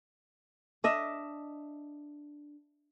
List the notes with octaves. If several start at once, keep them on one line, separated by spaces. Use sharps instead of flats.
D4 D#5 E5